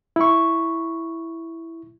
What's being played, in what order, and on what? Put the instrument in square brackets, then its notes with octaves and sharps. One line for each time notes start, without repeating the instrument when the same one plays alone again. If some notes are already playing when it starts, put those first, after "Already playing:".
[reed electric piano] E4 C#6